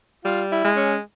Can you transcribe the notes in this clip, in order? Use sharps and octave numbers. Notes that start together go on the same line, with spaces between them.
G3 F4
E4
G#3
C#4